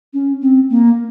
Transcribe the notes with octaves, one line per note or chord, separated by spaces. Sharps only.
C#4
C4
A#3